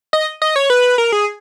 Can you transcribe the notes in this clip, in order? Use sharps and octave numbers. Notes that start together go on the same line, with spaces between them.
D#5
D#5
C#5
B4
A#4
G#4